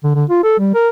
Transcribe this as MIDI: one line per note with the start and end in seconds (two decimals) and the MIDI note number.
0.04 0.12 50
0.15 0.24 50
0.29 0.40 65
0.43 0.54 69
0.59 0.71 55
0.74 0.89 70